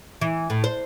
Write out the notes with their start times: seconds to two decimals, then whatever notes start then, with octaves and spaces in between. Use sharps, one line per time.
0.21 E3
0.50 A2
0.64 C5